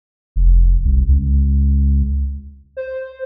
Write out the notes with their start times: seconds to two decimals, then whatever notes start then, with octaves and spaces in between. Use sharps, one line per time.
0.36 F1
0.85 C2
1.09 C#2
2.77 C5